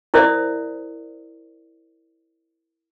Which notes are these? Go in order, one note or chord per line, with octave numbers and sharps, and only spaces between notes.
E4 A#4 C5 D5 E5 D#6